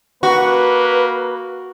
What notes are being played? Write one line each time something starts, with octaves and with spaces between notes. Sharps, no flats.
A#3 F#4 B4